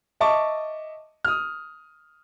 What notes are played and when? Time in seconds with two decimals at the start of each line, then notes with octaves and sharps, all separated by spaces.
0.20 D#5 E5 A5 C#6 D6
1.25 D#6 F6